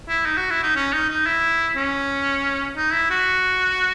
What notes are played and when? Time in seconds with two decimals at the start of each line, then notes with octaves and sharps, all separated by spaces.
0.08 E4
0.26 D#4
0.37 F#4
0.50 E4
0.63 D#4
0.76 C#4
0.93 D#4
1.10 D#4
1.26 E4
1.76 C#4
2.76 D#4
2.93 E4
3.11 F#4